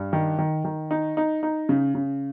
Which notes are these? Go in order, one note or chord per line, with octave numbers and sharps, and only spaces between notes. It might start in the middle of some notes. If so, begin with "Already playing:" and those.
Already playing: G2
D#3
D#3
D#3
D#4
D#4
D#4
C#3
C#3